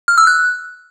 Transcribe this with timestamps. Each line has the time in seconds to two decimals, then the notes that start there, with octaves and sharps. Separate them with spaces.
0.08 F6
0.18 E6
0.27 F#6